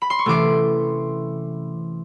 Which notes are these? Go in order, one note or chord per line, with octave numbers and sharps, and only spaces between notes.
B5
C6
C#6
C3 E3 A3 C#4 C6 D6